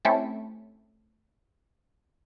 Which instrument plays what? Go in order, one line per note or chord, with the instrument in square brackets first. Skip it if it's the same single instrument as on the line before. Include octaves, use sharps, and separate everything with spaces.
[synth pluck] A3 C4 C#4 E4 G4 A4